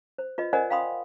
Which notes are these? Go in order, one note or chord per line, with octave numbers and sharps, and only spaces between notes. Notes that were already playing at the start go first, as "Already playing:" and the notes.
C5
F4 B4 D#5
A#4 C5 D5 D#5 F#5 G#5
F5 G5 B5 C6 D#6